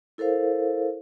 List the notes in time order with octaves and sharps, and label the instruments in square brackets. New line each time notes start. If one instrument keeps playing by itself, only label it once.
[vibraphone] E4 A4 A#4 C5 F5